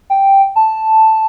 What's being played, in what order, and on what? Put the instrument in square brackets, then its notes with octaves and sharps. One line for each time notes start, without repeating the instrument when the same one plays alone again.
[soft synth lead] G5
A5